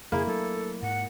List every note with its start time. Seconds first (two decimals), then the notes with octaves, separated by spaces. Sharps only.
0.12 F2 C#3 A#3 E4 G#4
0.27 F#3 A3 D4 A4
0.82 G#2 F#5